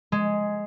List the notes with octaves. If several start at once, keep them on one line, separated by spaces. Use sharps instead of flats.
G#3